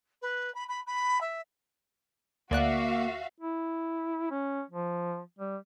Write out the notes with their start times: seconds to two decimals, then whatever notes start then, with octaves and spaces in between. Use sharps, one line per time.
0.22 B4
0.54 B5
0.68 B5
0.87 B5
1.21 E5
2.51 D2 A#3 F#4 D5 E5 F5 F#6
3.40 E4
4.31 C#4
4.70 F3
5.38 G3